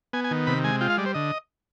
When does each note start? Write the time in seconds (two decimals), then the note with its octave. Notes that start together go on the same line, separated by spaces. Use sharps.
0.13 B3 G#5
0.24 G#5
0.31 D#3
0.47 C3 B5
0.64 G#3 G#5
0.81 F4 G5
0.90 F5
0.98 G3 D5
1.06 C5
1.14 D3 D#5